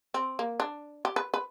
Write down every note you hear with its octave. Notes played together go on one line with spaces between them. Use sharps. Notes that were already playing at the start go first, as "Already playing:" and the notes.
C4
A#3
D4
G4
B4
B4